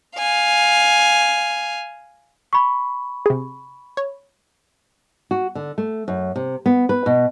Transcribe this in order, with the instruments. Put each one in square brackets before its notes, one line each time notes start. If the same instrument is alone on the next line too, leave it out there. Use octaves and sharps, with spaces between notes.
[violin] F5 G#5
[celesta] B5 C#6
[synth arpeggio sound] C3 G#4
C#5
[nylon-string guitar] F#4
D3
A3
F#2
C3
B3
B4
B2